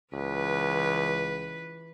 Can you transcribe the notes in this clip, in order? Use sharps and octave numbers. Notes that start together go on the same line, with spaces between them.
C#2 E3 B4